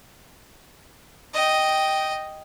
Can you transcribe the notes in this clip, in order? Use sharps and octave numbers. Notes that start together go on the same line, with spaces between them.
D#5 G5